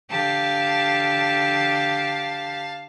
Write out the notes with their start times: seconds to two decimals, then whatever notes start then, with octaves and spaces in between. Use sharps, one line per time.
0.10 D3 G4 F5 A5